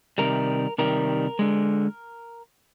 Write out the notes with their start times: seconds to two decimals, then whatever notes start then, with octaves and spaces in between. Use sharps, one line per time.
0.18 C3 D#3 G3 A#4
0.78 C3 D#3 G3 A#4
1.39 D3 G#3